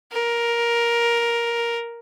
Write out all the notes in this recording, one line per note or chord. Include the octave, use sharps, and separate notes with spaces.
A#4